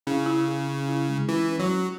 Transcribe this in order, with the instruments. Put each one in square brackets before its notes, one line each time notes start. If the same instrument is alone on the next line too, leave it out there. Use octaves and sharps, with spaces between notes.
[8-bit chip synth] C#3 [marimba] E4
[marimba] E4
G#4
C#4
E4
G#3
[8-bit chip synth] E3 [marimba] C#4
[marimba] C#4
[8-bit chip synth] F#3
[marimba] C#4